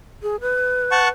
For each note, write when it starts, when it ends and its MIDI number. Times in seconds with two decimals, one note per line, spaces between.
0.23 0.36 68
0.41 1.10 71
0.91 1.08 78
0.91 1.08 81
0.91 1.08 85